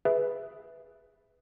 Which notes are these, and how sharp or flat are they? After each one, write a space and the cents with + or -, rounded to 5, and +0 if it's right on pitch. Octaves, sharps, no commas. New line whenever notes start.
G#4 +0 B4 +0 E5 -5